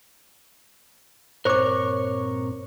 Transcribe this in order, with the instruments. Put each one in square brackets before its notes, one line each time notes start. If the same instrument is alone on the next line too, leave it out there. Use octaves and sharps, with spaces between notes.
[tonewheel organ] G2 A#2 C4 [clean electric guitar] A#4 C#5 [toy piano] C5 D6